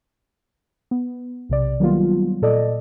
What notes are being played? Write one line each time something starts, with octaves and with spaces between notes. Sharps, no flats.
B3
B1 C3 D5
D#3 F#3 G3 A#3 B3 F4
A#2 A4 D5 D#5